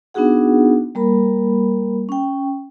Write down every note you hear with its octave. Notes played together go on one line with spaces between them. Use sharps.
B3 D4 D#4 F#4 G#4 F#5
G3 A#3 A#4 B5
C#4 G5